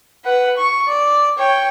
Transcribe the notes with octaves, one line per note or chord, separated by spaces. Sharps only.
B4 F#5
C#6
D5
C#5 G5